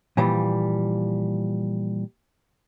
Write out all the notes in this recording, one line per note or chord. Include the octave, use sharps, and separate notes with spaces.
A#2 E3 F3 G3